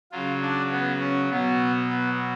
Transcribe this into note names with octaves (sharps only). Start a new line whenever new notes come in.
C#3 F#3 F4
D4
B3
C#4
B2 F#3 B3
B3